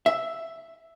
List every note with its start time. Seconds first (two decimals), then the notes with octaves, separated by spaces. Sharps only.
0.06 E5